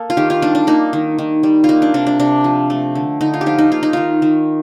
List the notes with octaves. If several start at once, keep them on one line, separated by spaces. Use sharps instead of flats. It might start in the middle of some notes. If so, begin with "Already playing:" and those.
Already playing: A#3 A4
F4
D#3 G4
F4
G3 D4
D4
A#3 D#4
D#3
D#3
G3
F4
A#3 D#4
D4
C3 D4
D4
C3 D4
F3
A3
D3
D3 D#4
F4
G4
F3 F4
D#4
A#3 F4
D#4
D#3 F4
D#3